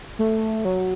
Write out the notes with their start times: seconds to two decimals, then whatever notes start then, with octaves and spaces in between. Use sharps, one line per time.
0.19 A3
0.65 F#3